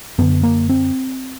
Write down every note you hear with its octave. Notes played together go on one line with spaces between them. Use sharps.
F#2 D3 B3
A#3
C4